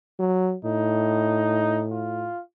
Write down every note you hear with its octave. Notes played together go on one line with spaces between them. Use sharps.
F#3
A2 D#4
F4